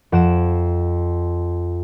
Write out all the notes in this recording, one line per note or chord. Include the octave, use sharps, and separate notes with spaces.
F2 F#5 D7 E7